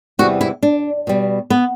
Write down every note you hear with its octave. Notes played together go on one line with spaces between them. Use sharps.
E2 C3 E3 G3 F#4
E4
D4
B2 G3
B3